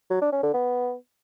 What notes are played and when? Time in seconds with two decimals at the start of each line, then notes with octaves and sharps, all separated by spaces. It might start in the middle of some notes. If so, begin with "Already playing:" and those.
0.10 F#3
0.21 D4
0.32 C#4
0.43 D3
0.54 B3